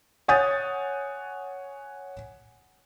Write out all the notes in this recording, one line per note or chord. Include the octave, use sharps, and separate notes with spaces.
C#5 F#5 G#5 D#6 G6 A6